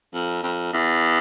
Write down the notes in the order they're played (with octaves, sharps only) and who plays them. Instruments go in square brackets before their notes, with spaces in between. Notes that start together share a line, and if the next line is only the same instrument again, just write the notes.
[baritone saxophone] F2
F2
E2